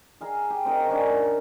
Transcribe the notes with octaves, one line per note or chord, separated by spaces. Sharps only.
G#4 F5 A#5
G4
C4 D#4 A#4
D#3 C#4 D4